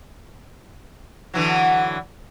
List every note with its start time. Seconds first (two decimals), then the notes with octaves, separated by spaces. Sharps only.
1.34 D3 E3 F#3